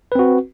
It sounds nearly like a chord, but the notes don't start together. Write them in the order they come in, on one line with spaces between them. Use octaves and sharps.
B4 C4 F#4